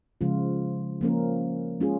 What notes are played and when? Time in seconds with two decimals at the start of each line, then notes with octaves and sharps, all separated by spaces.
0.21 C#3 F3 G#3 F4
1.01 F3 A#3 C#4 A#4
1.81 G#3 C#4 F4 G#4